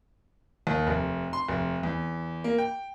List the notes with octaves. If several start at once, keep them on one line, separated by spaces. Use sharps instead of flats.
D#2
F1
C6
F1
E2
A#3
G5